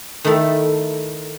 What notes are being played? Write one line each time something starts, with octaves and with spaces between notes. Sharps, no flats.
D#3 A3 E4 A4